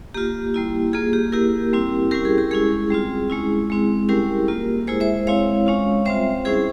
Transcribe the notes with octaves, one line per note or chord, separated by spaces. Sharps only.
A#3 F4 G4
G3 A#3 E4
A#3 F4 G#4
G4
A#3 E4 G4 A#4
G3 C4 E4
G3 C#4 E4 G4 A#4
G#4
G4
G#3 C#4 E4 G#4
G3 C4 F4
G#3 C#4 E4
G#3 C4 E4
G3 C#4 E4 G4 A#4
A#3 F4
G#3 E4 G#4 C5
C5 E5
G#3 C4 E4 C#5 F5
G#3 C#4 F4
G3 C4 F4 C5 E5
G3 C#4 E4 G#4 C5